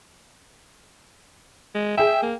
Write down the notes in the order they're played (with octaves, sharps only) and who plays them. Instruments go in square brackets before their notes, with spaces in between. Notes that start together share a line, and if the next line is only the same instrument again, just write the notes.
[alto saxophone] G#3
[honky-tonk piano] G#4 G5 [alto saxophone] E5
[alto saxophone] A#3